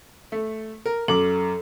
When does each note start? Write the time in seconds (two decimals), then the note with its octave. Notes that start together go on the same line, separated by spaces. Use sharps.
0.32 A3
0.86 A#4
1.08 F#2 A4 D6